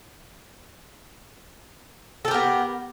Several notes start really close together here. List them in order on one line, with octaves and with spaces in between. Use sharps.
A4 G4 A#4 B3